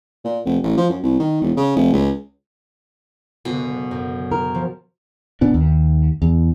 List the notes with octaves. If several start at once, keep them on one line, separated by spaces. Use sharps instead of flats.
A#2
F1
A1
F3
F#2
C2
D#3
E1
C#3
F1
C#2
F#1 B2 D3
F#2
A#4
F3
A#2 B3 D4
D#2
E2